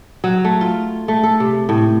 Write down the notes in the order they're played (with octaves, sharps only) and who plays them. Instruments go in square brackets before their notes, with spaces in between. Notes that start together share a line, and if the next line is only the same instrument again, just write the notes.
[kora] F#3
A3
F4
A3
A4
C3
A2